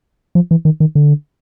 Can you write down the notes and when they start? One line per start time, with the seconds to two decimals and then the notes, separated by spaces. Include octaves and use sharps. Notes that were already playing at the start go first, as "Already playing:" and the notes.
0.35 F3
0.51 E3
0.65 D#3
0.80 D#3
0.95 D3